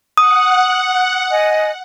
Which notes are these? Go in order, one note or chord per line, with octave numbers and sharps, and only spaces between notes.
F#5 D#6
D#5 G#5